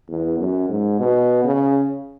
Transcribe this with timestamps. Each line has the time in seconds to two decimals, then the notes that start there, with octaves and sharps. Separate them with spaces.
0.09 E2
0.38 F#2
0.69 G#2
1.00 B2
1.44 C#3